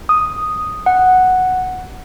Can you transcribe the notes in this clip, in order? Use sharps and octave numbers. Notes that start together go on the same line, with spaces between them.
D#6
F#5